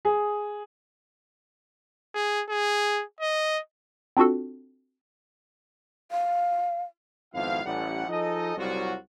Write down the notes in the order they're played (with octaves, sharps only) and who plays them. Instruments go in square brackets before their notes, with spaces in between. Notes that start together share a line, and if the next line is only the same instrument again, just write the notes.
[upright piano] G#4
[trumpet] G#4
G#4
D#5
[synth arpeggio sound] C4 D4 F4 F#4 A4
[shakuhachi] F5
[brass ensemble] G#1 F2 B3 E4 F5
A1 G3 F#5
F3 D#4 G#4 A4 D#5
C2 F#3 F4 F#4